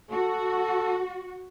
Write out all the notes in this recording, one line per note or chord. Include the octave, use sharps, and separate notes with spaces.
F#4 A4